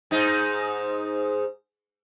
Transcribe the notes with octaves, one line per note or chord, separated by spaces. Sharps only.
G#2 D#4